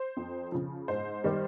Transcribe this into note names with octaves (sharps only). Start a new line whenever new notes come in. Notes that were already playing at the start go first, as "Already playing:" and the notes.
Already playing: C5
F2
C#3 F3
G#2 C5
D#3 G3